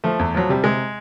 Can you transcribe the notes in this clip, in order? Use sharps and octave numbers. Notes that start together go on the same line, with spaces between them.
F3 A3
E2
F3 F#3
C3 G3
C3 G#3